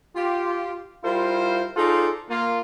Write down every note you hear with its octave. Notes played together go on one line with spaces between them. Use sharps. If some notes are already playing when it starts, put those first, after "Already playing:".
F4 G4
G3 E4 F4 A#4 C5
D#4 F4 G#4 A4 C5 D5
A#3 F4